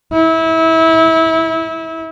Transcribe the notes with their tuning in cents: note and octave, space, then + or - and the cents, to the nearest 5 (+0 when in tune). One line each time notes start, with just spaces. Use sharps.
E4 -25